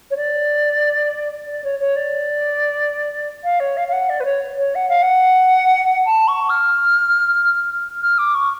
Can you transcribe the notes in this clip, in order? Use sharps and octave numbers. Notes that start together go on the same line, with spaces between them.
C#5
D5
D5
C#5
C#5
D5
F5
C#5
F5
F5
F#5
D5
B4
C#5
C#5
F#5
F5
F#5
A5
C#6
F6
F6
D6
C#6